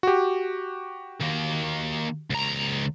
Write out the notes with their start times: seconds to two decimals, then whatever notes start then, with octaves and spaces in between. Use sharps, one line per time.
0.03 F#4 G4
1.21 D#3 A#3
2.30 C#2 A#5